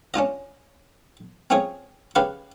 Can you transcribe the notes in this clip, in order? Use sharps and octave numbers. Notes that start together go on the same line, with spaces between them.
C#4 D4 F4 D#5
C4 C#4 F4 G#4 C#5
C#3 G4 B4 F5 C#6